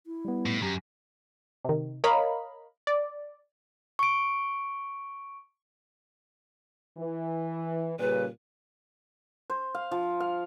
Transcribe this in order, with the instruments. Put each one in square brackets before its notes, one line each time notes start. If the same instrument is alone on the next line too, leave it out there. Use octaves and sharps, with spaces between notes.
[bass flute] E4
[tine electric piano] G3 B3
[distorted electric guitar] A2
[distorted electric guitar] F#2 [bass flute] G4 [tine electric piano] A#5
[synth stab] C3 D#3
A#4 C#5 D#5 F5 A#5 B5
D5
[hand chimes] C#6 D7
[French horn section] E3
[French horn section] A#2 C#3 G3 [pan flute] B4
[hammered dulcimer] C5
F5
F3
F5